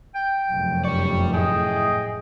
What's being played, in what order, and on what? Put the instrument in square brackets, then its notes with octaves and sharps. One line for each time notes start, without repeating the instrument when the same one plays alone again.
[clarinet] G5
[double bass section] F1 F#2
[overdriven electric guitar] G4 D5 [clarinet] C#6
[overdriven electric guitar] A2 [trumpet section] G#4 D#5 [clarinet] G5